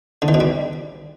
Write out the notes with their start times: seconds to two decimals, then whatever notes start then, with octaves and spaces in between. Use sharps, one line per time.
0.22 D3
0.28 D#3
0.34 B2
0.40 G3